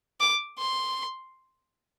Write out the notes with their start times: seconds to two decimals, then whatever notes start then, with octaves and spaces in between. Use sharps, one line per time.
0.20 D6
0.59 C6